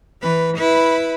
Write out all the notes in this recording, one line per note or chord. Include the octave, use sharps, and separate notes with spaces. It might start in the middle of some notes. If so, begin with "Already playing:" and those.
E3 B4
E4 B4